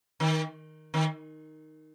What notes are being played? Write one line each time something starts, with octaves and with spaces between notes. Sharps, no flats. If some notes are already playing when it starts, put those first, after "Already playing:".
D#3
D#3